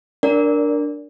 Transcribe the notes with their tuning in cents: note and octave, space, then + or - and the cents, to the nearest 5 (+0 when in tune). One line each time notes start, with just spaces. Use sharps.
D4 +0 A#4 +0 D5 -25